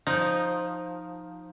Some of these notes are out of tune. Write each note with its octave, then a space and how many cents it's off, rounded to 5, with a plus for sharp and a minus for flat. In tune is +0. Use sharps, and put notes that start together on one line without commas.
F3 +10 D#4 +0